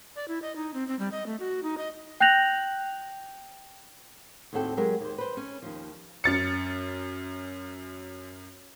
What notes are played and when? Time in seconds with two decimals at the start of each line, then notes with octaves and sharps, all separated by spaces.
0.16 D5
0.28 E4
0.42 D#5
0.56 D#4
0.74 C4
0.88 C4
0.99 G3
1.12 D#5
1.27 A3
1.40 F#4
1.63 D#4
1.78 D#5
2.20 G5 F#6 G6 A#6 F7 F#7
4.53 D#2 A2 C4 F#4 A4 G5
4.77 F#3 G#3 G4 A#4
5.01 D#2 C5
5.18 B4 C5
5.37 C#4
5.62 D#2 F3
6.24 F#2 A6 C#7